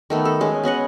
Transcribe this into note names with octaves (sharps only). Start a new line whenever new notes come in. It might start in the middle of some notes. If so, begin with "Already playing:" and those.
D#3 A3 B3
A4
G#3 C#4
B3 C#4 D#5 F#5